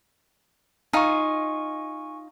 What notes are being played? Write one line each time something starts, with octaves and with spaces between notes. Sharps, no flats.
D#4 F4 F5 G#5 C#6